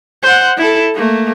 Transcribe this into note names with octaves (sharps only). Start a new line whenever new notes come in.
C5 F#5
E4 A4
A3 A#3